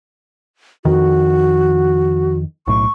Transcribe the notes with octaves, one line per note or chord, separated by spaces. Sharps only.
F2 D#3 F#4
B1 A2 C#6